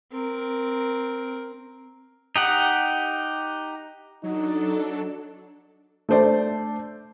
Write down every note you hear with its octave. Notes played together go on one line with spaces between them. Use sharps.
C4 A#4
D#4 G4 F#5
F#3 D4 D#4 A4
A3 D4 C5 D5 A5